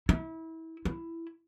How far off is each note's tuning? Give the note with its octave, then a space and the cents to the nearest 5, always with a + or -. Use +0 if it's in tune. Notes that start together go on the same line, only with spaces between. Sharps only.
E4 -30
E4 +10